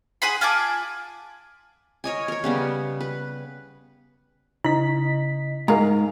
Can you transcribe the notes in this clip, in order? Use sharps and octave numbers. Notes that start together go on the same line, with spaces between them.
G#4 F#5 B5 C6
F4 G#5 A5 D6
A#4 C#5 D#5 G#5
A#4 C#5
C#3 G3 B3
B4
C#3 E4 D#5 B6
G#2 A#4 F5 A#5